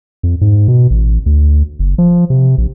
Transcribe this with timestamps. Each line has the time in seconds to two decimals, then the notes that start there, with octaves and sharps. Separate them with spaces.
0.23 F2
0.41 G#2
0.68 B2
0.90 A1
1.26 D2
1.79 F#1
1.98 F3
2.30 C3
2.58 A#1